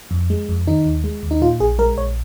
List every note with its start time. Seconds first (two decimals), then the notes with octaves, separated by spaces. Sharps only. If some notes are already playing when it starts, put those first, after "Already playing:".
0.11 F2
0.30 G#3
0.49 F2
0.67 D#3 D#4
0.86 D#2
1.04 G#3
1.23 D#2
1.31 D#4
1.42 A#2 F4
1.60 A#1 G#4
1.78 G#3 A#4
1.97 A#1 C#5